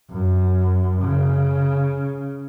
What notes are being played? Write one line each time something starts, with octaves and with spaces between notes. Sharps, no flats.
F#2
C#3